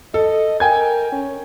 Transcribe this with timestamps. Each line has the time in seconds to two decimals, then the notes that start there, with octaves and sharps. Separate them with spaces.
0.14 A4 D#5
0.60 A#4 G5 G#5 G#6
1.12 C#4